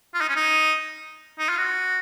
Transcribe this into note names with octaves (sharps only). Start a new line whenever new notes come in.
F4
D#4
C#4
D#4
D#4
F4
F#4